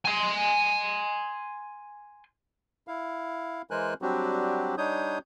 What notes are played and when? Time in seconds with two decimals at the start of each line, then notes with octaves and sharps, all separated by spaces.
0.05 G#5 C6
2.88 E4 F5
3.71 E3 G#3 A#4 C5 G#5 F#6
4.02 F#3 G3 C4 D4 F#4 G4
4.78 G3 D4 D#4 C#5 D#6 G6